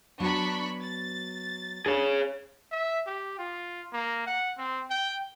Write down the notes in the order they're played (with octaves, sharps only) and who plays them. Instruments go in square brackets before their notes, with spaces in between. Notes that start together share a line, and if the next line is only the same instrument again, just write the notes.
[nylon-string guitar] F#3 B3 [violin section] D4 B5 C#6
[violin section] A6
[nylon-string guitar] D4 [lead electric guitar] G#4 C#5
[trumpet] E5
G4
F4
A#3
F#5
C4
G5